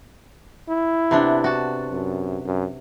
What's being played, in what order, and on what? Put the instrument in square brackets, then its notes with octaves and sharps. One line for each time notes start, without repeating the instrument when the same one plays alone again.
[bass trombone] E4
[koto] C3 B3 D4
F#4 A5
[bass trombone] F#2
F#2